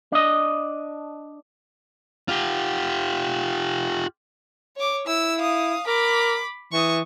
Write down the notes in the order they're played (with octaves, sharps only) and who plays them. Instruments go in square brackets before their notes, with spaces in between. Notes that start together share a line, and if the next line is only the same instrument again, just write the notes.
[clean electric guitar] D4 D#5
[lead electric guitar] F4 G4
[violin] C#5 D6
[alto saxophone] E4 [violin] E6
[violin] F5 D#6
[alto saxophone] A#4 [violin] B5 D6
[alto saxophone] E3 [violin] C#6 D#6